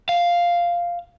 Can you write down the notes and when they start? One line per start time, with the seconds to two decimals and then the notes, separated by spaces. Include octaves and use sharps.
0.09 F5